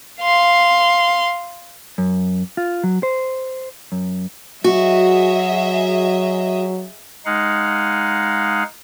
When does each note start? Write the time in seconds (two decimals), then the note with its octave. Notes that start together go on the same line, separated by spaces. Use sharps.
0.21 F5 C6
1.98 F#2
2.57 F4
2.84 F#3
3.03 C5
3.92 F#2
4.64 F#3 F#4 G#4 D#5 E5
7.26 G#3 D#4 F5 F#5